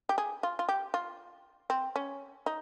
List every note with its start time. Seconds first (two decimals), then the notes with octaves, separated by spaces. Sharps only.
0.09 G4
0.18 G#4
0.43 F4
0.59 F4
0.69 G4
0.94 F4
1.70 C4
1.96 C#4
2.46 D#4